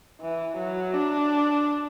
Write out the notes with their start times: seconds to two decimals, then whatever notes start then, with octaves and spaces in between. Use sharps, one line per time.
0.21 E3
0.57 F#3
0.94 D4